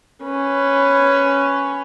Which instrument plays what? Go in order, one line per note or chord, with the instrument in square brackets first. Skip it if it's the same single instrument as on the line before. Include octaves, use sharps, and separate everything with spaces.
[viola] C#4 B4